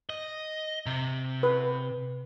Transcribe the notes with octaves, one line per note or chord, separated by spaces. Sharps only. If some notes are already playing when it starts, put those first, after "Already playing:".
D#5
C3
B4